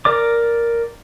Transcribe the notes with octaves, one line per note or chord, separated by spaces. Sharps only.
A#4 D5 D6